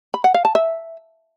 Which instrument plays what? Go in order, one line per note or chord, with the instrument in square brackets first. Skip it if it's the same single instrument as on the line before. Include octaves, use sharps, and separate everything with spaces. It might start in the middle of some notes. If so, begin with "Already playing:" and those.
[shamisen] B5
F#5
F5
A5
E5